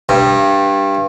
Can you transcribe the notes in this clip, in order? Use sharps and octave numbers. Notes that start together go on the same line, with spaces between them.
G2